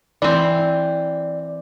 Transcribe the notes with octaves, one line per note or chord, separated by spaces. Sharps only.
E3 C4 D5